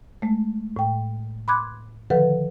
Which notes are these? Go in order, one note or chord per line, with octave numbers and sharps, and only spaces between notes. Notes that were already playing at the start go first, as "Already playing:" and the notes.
G#3 A3
A2 G5
B5 C6 D6 F#6 G#6
D3 D#3 F3 A4 B4 F#5